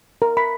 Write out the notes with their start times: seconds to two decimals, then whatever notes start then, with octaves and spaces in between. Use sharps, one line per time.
0.22 A#4
0.37 B5